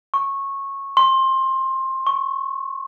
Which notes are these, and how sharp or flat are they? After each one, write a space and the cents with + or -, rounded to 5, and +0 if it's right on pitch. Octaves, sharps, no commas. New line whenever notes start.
C#6 -15
C6 +20
C#6 -15